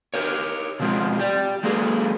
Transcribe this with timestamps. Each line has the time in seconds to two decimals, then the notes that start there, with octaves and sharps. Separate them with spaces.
0.14 G4 A#4 C#5
0.80 B2 D3 F3 G#3 C4 F4
1.19 G4 D5
1.63 F#3 G#3 A#3 G#4 A4 B4